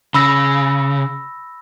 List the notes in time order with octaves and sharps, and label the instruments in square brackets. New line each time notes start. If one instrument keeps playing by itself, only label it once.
[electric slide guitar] C#3 [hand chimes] B5 E6 A#6